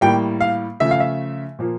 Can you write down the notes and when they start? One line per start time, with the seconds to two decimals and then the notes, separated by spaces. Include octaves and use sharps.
0.01 A2 G3 A#3 G5
0.41 F5
0.80 C#3 F3 A3 E5
0.91 F5
1.00 E5
1.59 A#2 F3 A#3